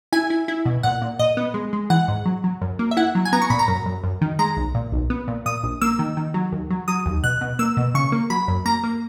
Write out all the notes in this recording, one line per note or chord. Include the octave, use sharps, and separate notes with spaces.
E4 G#5
E4
E4
B2
A#2 F#5
A#2
A#2 D#5
B3
G#3
G#3
E3 F#5
G#2
F#3
F#3
F#2
A#3
E5
E4 F#5
F#3
G#5
B3 A#5
C#6
A#2 B5
A#5
F#2
F#2
F#2
D#3
G#3 A#5
B1
A#2
B1
B3
A#2
A#2 D#6
A#1
A#3 E6
D#3
D#3
F#3
D#2
F#3
F#3 D#6
D#2
B2 F#6
B2
A#3 E6
B2
C#3 C#6
A#3
F#3 B5
F#2
A#3 A#5
A#3